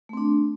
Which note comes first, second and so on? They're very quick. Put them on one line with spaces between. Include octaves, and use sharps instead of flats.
A3 C4 D4